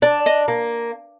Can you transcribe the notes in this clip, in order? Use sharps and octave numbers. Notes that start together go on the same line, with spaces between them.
D4 D5
D#5
A#3